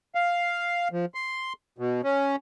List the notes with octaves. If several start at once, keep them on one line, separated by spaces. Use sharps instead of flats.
F5
F3
C6
B2
C#4